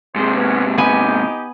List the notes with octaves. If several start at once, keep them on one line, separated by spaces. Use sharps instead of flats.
G#2 C3 G#4 C5
B3 C#4
B3 D#4 G4 G#5